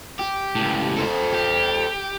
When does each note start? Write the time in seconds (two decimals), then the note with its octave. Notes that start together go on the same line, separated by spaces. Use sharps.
0.19 G4
0.55 C#2 A2
0.98 A4 C5
1.33 G4